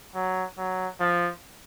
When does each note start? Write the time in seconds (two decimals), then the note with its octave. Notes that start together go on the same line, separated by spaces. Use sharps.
0.15 F#3
0.58 F#3
1.00 F3